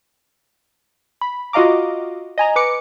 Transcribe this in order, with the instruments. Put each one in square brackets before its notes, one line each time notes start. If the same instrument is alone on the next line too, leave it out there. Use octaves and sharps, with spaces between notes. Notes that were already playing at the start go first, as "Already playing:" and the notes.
[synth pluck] B5
F4 F#4 D#5 F5 A#5 D6
D#5 G#5 A#5
B4 D6 C#7